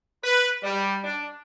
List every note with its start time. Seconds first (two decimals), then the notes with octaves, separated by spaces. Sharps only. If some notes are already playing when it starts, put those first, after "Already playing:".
0.23 B4
0.63 G3
1.04 D4